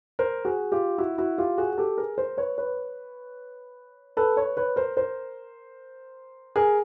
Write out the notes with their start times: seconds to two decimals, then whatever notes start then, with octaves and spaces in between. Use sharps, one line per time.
0.19 A#4 C5
0.45 F#4 G#4
0.72 F4 G4
0.98 E4 F#4
1.18 E4 F#4
1.38 F4 G4
1.58 F#4 G#4
1.72 G#4
1.78 G4 A4
1.98 G#4 A#4
2.18 A#4 C5
2.37 B4 C#5
2.58 B4 C#5
4.17 A4 B4
4.37 B4 C#5
4.57 B4 C#5
4.76 A#4 C5
4.97 A#4 C5
6.56 G#4 A#4